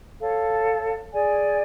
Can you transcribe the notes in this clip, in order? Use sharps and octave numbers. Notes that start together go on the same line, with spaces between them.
A4 C#5 F5
G#4 D5 G#5